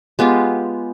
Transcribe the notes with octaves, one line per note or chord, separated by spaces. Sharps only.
G#3 B3 F4 G4